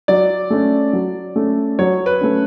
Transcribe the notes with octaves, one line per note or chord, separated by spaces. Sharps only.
F#3 D5
A3 C#4
F#3
A3 C#4
F#3 C#5
B4
A3 C#4